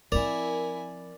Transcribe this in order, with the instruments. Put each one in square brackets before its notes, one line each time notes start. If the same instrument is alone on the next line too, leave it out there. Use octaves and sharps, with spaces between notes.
[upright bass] F3 C4 [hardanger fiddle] E4 G#5 [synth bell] A#4 [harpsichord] D5